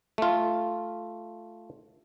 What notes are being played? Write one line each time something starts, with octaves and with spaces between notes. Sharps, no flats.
A3 F4